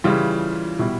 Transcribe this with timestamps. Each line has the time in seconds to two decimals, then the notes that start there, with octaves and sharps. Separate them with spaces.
0.04 C#3 E3 G3 F4
0.79 B2 G3 E4